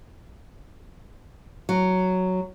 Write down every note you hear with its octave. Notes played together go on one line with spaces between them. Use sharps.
F#3